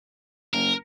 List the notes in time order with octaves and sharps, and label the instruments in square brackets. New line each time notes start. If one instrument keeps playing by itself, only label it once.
[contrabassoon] F#1 [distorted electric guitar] A#4